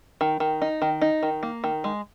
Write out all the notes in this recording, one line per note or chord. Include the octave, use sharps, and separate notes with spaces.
D#3
D#3
D#4
D#3
D#4
D#3
A#3
D#3
G#3